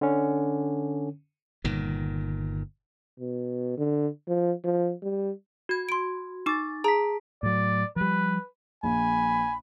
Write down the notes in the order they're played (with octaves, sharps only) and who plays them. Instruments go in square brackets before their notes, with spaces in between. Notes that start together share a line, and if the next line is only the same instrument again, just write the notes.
[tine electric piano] D3 C#4
[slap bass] G1 A#2 D#3
[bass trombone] B2
D3
F3
F3
G3
[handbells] F#4 G#6
[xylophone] C6 D7
[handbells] D#4 A6 [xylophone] C#6 D6
[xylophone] G#4 A#5 [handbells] A5 B6
[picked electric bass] A2 F#3 [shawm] D5
[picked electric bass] F3 G3 [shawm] B4
[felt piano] A#1 [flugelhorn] G#5 [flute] B5